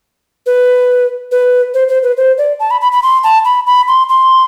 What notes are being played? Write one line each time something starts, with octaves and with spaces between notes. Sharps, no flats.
B4
B4
C5
C5
B4
C5
D5
A5
B5
B5
B5
C6
A5
B5
B5
C6
C6